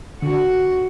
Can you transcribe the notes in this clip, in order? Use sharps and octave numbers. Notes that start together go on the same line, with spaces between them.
D3 F#4